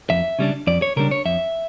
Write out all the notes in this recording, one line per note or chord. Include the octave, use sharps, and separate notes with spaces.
F2 E5
C#3 G3 D4
F2 D5
C#5
C#3 G3 D4 A#4
C#5
F2 E5